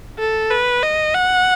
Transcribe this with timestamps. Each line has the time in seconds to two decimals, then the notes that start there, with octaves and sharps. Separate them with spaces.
0.20 A4
0.51 B4
0.83 D#5
1.15 F#5